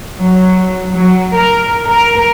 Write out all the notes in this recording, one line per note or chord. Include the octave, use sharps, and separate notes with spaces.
F#3
F#3
A#4
A#4